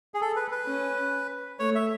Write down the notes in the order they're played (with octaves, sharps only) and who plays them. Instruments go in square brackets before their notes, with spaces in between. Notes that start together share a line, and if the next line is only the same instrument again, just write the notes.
[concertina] G#4
A4
B4
B4
[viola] C#4
[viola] A3 [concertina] C#5
[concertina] E5